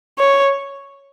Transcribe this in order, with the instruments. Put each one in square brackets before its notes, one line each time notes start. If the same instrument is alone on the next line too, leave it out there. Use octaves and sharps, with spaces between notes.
[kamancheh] C#5